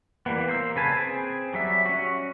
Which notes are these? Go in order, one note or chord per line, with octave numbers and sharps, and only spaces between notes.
E3 G3 A#3 B3
A#3 C5 E6
C#3 B4 G#5 A5
C4 G#4
F#3 G3 E5
C#4 F#4